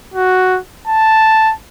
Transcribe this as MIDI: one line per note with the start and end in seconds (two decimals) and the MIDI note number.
0.14 0.59 66
0.87 1.53 81